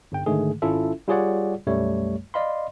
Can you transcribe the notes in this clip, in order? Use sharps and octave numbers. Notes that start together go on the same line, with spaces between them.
G1 G5
G#2 D3 D#3 G#3 A3 G#4
G#1 C#4 E4 F4 A4 E5
G3 F4 G#4 C#5 D5 F#5
B1 F#2 G3 A3 C#5
D5 D#5 F5 B5 C6